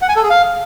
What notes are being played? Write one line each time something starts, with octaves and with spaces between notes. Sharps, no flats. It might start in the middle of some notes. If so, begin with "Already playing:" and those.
F#5
G#5
A4
G#4
F5